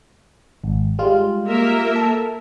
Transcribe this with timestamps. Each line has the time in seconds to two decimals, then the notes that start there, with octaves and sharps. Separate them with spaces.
0.64 G#1
0.99 G3 G#3 F4
1.46 A#3 A#4 E5
1.96 A4